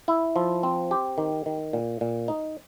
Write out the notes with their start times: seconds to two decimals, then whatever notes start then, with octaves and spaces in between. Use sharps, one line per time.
0.08 E4
0.36 F3
0.63 C4
0.91 G4
1.18 D#3
1.46 D#3
1.73 A#2
2.01 A#2
2.28 D#4